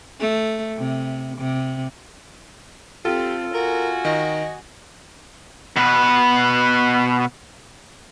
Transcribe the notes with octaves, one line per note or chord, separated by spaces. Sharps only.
A3
C3
C3
C4 F4 G4 A4
F#4 A#4 G#5
D#3 D#5
B2 B4